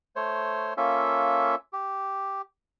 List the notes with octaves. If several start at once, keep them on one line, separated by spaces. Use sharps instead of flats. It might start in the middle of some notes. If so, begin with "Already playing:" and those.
A3 C5 C#5
A#3 C#4 F4 A4 E5
G4